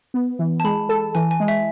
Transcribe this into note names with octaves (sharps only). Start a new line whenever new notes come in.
B3
E3
A5
G#3 B5
A4 A5
E3 G#5
G#5
G#3
E5